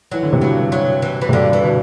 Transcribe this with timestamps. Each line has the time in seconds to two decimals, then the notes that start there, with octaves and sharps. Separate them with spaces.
0.11 E3 F#3
0.23 D3
0.33 C3
0.41 G2 B2 F#3
0.72 F#3
1.02 E3
1.21 E3
1.29 C3
1.33 G2 B2 D3
1.53 E3
1.63 B2 D3